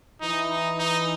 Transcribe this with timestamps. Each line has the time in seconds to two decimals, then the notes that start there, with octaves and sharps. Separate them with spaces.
0.21 E3 D#4
0.50 D#4
0.78 D#4